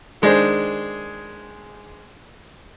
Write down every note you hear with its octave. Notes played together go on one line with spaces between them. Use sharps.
D#3 G#3 D4 G#4 C5